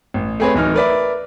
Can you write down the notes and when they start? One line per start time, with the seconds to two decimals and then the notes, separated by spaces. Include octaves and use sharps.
0.14 A1
0.40 A3 C4 G#4 B4 C#5
0.54 D1 E3 D#4 F6
0.74 A#4 B4 D5 E5